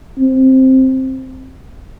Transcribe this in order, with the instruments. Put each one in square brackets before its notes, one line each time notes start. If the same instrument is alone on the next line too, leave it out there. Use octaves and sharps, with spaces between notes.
[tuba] C4